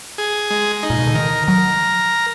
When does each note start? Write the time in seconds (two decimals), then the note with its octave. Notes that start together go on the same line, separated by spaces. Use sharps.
0.18 G#4
0.50 G#3
0.83 D#4
0.90 A#2
0.99 B2
1.07 D3
1.15 D#3 A#4
1.47 F#3 A#4